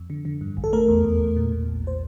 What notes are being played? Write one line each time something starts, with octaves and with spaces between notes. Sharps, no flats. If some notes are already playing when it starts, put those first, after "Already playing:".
Already playing: F2
D3
D3
G2
A1
A4
A3 A#4
E2
E2
E2
A#2
A#2
A#1
A#2 C5